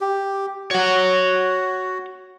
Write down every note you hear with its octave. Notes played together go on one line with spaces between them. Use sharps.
G4
F#4 C#5 F#5